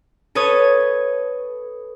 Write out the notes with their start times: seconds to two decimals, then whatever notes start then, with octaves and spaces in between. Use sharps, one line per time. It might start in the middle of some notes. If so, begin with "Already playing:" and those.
0.35 A4 B4 C#5 D#6 G#6